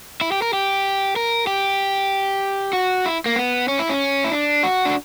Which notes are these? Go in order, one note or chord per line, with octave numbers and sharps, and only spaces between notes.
E4
G4
A#4
G4
A#4
G4
F#4
E4
A#3
B3
C#4
E4
C#4
E4
D4
F#4
D4